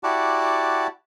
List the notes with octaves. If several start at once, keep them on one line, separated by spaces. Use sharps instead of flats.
E4 F#4 G4 D5 F#5 A5